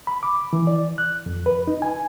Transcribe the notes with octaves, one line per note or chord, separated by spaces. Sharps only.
B5
D6
E3
D5
F#6
F2
B4
D#4
G#5